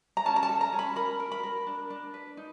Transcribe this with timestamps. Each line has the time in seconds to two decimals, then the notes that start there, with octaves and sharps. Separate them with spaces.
0.17 A#5
0.26 C#4 A5
0.36 A#5
0.43 A5
0.49 A4
0.61 A#5
0.73 C#4
0.79 B5
0.96 A#4 B5
1.20 A#4
1.32 B5
1.43 A#4
1.67 D4
1.90 D4
2.14 B4
2.37 D#4